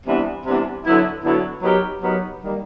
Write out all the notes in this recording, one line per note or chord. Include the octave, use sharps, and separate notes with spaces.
C3 E3 G3 B3 D4
C3 E3 G3 B3 D4
D3 F#3 B3 E4
D3 F#3 B3 E4
F#3 B3 D#4 G4 A#4
F#3 B3 D#4 G4 A#4
D#3 G3 A#3